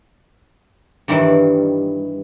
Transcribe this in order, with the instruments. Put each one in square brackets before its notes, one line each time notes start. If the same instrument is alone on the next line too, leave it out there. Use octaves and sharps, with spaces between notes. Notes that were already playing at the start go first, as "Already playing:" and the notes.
[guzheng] G2 D#3 E3 F#3 G3